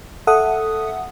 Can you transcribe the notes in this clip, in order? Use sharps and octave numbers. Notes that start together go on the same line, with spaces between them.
A4 E5 F#5 D#6